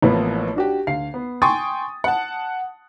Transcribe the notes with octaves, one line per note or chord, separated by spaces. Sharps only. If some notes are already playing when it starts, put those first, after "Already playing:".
A1 A2 F3 A#3 B3 B4
D4 F#4 G4
D2 F5 C7
B3
G5 G#5 C6 C#6 D#6 A6
F#5 A5